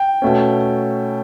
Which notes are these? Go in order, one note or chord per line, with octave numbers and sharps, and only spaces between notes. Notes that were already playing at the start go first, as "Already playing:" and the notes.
Already playing: G5
B2 A3 C#4